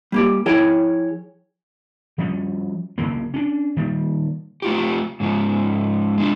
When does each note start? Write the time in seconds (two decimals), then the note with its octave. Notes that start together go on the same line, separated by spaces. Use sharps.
0.12 G3 A#3 G4
0.46 F3 E4 G#4 A#4 C#5 G5
2.18 F3 G3 C#4
2.98 B1 F#2 C#3 A#3
3.34 C#4 D4
3.77 D#3 G3 A#3
4.62 A3 F4 G4
5.20 G#2 C#3 F3
6.18 G#3 D4 F4